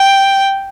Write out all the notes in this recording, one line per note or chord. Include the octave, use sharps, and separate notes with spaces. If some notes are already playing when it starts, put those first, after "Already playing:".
Already playing: G5